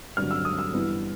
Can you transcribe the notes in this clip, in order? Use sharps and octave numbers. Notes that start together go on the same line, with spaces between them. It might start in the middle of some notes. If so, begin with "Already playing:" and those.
G2 D3 F#3 F6
E6
D#6
E6
G2 E3 G3 B3 E4